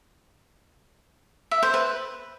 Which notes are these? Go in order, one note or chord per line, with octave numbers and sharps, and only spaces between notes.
E5
C5
B4